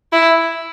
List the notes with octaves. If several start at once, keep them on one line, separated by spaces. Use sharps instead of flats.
E4